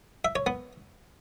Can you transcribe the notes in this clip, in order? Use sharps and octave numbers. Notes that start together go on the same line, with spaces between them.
E5
C#5
B3